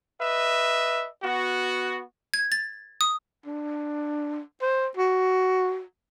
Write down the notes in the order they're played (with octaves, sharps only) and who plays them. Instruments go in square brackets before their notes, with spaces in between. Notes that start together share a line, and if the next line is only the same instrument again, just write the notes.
[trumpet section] B4 D#5 E5
B3 F#4
[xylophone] G#6
A6
D#6
[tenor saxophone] D4
C5
F#4